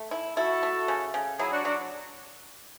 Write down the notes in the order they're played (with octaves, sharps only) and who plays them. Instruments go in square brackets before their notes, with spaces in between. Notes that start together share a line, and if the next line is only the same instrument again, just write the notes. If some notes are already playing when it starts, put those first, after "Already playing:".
Already playing: [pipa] A3
E4
[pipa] E4 [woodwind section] F#4 A4
[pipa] A3
C#3
C#3
[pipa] F#3 [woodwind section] E4 G#4
[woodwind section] D4 F#4
[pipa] F#3 [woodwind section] D4 F#4